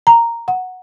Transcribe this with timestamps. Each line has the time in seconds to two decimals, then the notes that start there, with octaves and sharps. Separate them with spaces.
0.07 A#5
0.48 F#5